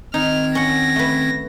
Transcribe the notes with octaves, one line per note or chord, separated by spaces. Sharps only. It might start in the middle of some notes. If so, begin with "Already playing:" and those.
D#3 C4 D#4 F6 G#6
C#4 F#5 A#6
A3 B4